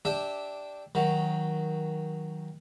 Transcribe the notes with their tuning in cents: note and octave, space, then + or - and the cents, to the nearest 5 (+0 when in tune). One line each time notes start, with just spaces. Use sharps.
D4 -5 G4 +0 E5 -15
D#3 +20 F#3 +0